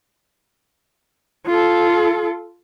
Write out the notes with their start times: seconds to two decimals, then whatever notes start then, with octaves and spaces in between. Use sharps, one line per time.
1.47 F4 A4